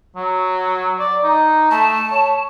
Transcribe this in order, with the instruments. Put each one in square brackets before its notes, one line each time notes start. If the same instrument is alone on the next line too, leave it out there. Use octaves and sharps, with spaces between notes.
[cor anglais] F#3
D5
D#4
[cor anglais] A3 [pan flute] A5
[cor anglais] C#5